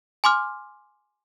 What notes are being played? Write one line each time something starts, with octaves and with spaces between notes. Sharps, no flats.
G#5 C6 D6 F6